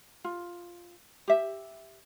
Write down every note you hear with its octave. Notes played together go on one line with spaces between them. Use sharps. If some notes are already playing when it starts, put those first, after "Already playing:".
F4
G4 E5